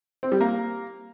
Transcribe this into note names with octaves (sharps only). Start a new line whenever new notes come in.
C4
G3
A#3